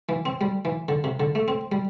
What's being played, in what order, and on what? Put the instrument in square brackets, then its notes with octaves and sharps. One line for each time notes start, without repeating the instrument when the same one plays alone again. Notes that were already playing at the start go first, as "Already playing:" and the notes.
[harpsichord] E3
C4
G3
E3
D3
C3
D3
A3
C4
G3